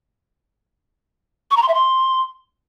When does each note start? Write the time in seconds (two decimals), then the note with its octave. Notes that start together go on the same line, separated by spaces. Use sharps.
1.51 C#6
1.57 A#5
1.62 C6
1.68 E5
1.74 C6